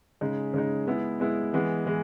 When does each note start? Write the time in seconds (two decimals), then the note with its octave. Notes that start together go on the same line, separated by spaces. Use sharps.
0.21 C#3 G#3 D#4
0.54 C#3 G#3 D#4
0.87 G#3 B3 E4
1.20 G#3 B3 E4
1.53 E3 G#3 B3
1.86 E3 G#3